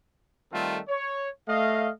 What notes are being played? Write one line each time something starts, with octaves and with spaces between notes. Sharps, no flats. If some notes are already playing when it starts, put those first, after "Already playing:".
D#3 G3 A3 C4 F4 A4
C#5
A3 D#5 F5